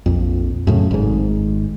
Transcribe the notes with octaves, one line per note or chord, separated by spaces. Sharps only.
A#1 F2
F#2 A2 C#3
G#1 G#2